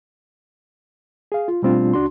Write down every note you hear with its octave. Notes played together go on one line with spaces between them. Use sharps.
G#4 F5
F4
B2 G3 A3 C4 D4 F4
C#2 D4 F#4 C6